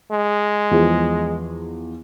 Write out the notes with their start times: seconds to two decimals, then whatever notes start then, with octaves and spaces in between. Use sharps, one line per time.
0.12 G#3
0.71 E2 F3